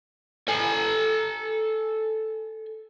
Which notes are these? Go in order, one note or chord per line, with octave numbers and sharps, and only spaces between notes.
A4 G#5